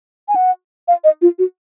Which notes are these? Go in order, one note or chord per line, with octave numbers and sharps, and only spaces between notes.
G#5
F#5
F5
D#5
F4
F#4